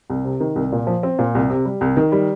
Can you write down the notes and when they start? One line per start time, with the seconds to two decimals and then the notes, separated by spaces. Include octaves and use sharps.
0.10 C2
0.24 C3
0.40 D#3
0.56 C2
0.72 A#2
0.87 F3
1.03 C4
1.19 A#2
1.35 C2
1.50 C3
1.65 G3
1.81 C2
1.97 D#3
2.12 G3